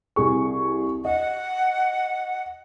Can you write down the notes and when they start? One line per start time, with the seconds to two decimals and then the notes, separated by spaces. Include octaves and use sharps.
0.16 C2 G#4 C#6
1.05 D#5 F#5